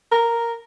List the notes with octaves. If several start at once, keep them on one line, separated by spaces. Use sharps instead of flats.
A#4